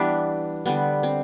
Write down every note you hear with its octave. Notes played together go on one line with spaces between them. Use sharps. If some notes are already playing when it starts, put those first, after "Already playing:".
Already playing: E3 G3 B3 D4
D3 G3 B3
C4